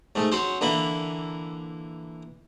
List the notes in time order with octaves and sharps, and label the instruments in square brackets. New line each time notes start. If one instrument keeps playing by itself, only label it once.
[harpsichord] G#2 A3
F#3 C#4 C5
D3 E3 A#3 B5